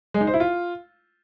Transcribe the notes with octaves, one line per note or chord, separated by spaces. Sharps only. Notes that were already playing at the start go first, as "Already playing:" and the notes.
G#3
D#4
C5
E4
F4